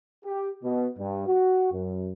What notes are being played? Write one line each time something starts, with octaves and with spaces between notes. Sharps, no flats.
G4
B2
G2
F#4
F#2